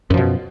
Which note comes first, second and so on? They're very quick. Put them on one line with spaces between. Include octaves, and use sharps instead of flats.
F#2 F3 B2